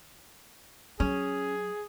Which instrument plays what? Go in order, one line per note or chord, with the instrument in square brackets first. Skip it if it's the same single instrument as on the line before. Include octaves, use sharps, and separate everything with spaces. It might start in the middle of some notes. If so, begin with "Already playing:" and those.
[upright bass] F#3 [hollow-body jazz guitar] C#4 [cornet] G#4